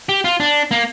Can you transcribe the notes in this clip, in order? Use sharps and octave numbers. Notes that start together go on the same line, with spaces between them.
G4
F4
D4
A#3